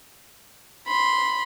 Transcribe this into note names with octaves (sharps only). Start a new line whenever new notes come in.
B5 C6